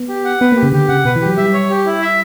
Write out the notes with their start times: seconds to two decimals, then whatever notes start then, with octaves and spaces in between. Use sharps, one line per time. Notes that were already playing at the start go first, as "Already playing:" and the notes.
Already playing: B3
0.09 G4
0.25 F#5
0.41 B3 B4
0.52 A#3 G4
0.63 C#3
0.72 D3 G4
0.88 C#3 F#5
1.05 B2 B4
1.16 E3
1.22 F#3 G4
1.37 G3 E5
1.53 C#5
1.70 G4
1.86 E4
2.02 E5